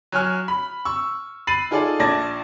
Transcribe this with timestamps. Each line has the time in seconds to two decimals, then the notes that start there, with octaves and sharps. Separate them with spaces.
0.12 F#3 C#5 G#5 F6
0.48 B5
0.85 C#6 E6
1.47 B5 A6 C7 D#7 F#7
1.71 D#4 F4 G#4 A4 D5
1.99 A#1 D5 A5 G#6 A#6